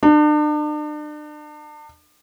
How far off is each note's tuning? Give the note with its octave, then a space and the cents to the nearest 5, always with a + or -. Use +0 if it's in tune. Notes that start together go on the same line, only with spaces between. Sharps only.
D4 +40